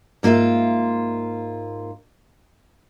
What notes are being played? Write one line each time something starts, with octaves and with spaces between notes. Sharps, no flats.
G#2 A#3 F4 C5 E5